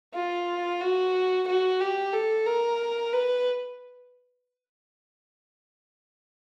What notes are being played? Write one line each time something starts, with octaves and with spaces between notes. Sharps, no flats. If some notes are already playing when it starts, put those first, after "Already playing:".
F4
F#4
F#4
G4
A4
A#4
B4